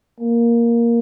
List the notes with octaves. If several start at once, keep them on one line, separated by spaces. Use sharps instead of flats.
A#3